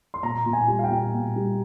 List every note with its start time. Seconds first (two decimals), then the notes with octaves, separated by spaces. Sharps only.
0.14 C6
0.23 A#2 A#5
0.46 A#2
0.53 G#5
0.68 G3
0.79 F5
0.84 G5
0.91 A#2
1.14 A#2
1.36 G3